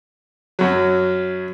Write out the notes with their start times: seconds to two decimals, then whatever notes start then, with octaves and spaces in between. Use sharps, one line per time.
0.59 F#2 F#3